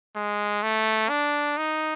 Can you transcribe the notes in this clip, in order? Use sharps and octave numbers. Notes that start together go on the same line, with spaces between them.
G#3
A3
D4
D#4